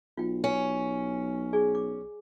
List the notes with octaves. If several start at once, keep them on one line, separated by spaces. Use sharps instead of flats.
B1 F4 G5
C#4
G#4 D5 G#5
D6